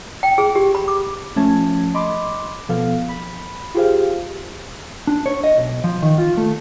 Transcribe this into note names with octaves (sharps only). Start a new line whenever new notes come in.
G5
G#4
G4
B5
D6
F3 A3 C#4 A5 G#6
D#5 B5 C6 D6
B2 F3 B3 A4 F5
B5
F4 G4 G#4 C5 F5
D4
C#5
D#5
B1
F3
D#3
F4
A3